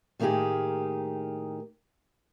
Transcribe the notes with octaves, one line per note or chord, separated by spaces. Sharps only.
A2 D#3 A#3 D#4 G4 G#4